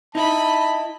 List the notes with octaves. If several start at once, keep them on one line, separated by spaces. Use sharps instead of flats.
D#4 E4 D#5 A5 B5